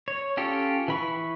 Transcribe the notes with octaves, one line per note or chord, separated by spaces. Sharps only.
C#5
C#4 F4 G4 A4 C#5
E3 B5 C#6